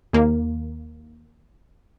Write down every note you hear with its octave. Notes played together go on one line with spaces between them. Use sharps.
D#2 A#3